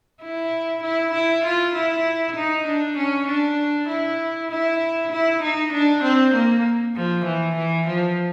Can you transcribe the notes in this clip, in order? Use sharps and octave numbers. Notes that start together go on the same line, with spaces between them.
E4
E4
E4
F4
E4
D#4
D4
C#4
D4
E4
E4
E4
D#4
D4
C4
A#3
F3
E3
E3
F3